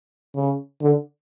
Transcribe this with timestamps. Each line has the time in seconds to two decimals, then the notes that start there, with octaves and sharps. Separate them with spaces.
0.35 C#3
0.82 D3